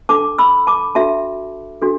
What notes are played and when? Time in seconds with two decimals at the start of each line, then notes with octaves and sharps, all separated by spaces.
0.09 D4 A4 A5 D6
0.38 B5 E6
0.67 A5 D6
0.95 D4 F#4 A4 E5 A5
1.82 D4 F#4 A4